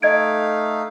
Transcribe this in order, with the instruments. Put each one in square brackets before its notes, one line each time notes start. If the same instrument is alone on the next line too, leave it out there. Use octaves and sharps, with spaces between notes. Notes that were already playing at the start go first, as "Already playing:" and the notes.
[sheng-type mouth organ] A3 D#4 F5 [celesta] D#5 G#6 D7